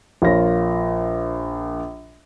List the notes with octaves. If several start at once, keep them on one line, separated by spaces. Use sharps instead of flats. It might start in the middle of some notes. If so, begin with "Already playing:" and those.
A#1 F4 A#4 C#5 A#6